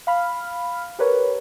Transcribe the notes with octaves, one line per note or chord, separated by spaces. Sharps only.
F5 B5 F6
G4 A#4 B4 C#5